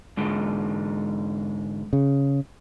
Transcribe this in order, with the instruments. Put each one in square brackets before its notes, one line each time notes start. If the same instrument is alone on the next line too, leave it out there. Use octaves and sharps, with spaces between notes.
[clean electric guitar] G#2 D3 G#3
[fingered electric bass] C#3